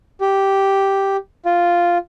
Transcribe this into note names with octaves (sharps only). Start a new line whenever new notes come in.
G4
F4